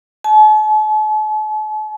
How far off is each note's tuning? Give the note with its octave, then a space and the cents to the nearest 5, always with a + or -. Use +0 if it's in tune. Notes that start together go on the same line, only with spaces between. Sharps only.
A5 -45